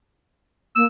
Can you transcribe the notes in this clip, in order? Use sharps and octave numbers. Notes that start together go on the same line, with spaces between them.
A#3 E6